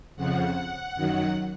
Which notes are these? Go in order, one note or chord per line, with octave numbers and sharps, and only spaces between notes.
F2 C#3 F3 F#5
F#2 D#3 F#3